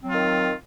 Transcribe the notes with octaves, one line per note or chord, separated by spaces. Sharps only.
D#3 F#3 C4 F4